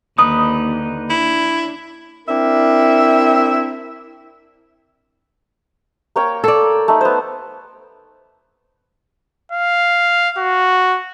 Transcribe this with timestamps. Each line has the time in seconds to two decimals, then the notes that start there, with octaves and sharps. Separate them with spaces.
0.18 D#2 D3 D#4 B4 D#6
1.10 D4 E4
2.27 C4 D4 E4 A#4 E5
6.16 A#3 C#5 G5
6.44 A4 D5
6.88 A3 D#4
7.01 B3 C5
9.52 F5
10.38 F#4